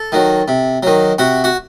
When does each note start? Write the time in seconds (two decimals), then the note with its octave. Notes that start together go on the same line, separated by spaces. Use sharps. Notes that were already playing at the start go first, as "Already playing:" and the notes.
Already playing: A4
0.12 D#3 F#3
0.48 C3
0.83 D#3 F#3
1.18 C3 F#4
1.44 F#4